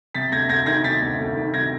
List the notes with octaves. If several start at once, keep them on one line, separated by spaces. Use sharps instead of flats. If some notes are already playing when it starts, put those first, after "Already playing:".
C3 A6 B6
D2 G#6 A#6
D2 G#6 A#6
D#3 G#6 A#6
C3 A6 B6
D2
D2
D#3
C3 G#6 A#6